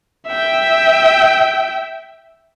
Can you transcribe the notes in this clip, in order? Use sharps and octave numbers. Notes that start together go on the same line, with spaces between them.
E5 G5